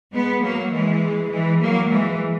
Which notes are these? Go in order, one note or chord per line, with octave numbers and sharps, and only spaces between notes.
G#3 B3
F#3 A#3
E3 G#3
E3 G#3
F#3 A#3
E3 G#3